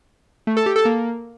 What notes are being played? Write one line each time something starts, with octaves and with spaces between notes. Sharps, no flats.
A3
A4
G4
A4
A#3